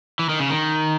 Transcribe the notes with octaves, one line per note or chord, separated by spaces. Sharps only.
E3
D#3
C#3
D#3